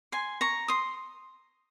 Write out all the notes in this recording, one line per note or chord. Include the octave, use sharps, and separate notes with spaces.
G#5 C6
A#5 C#6
C6 D#6